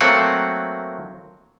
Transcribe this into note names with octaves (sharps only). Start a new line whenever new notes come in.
F#3 A3 A#3 C4 F#5